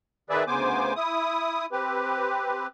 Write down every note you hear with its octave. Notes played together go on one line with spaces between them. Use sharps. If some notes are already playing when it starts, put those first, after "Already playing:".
D#3 G#4 B4 D5 E5
D2 C#3 B3 C5 G#5 D6
E4 D#6
C4 G4 B4